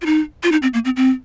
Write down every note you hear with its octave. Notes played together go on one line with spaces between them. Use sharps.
F4
D#4
F4
D#4
C4
A#3
C4
C4